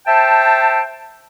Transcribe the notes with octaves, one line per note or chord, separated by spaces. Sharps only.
C5 E5 G5 A5